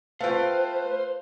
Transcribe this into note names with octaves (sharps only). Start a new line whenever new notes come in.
A3 F4 B4 C5 F5 G5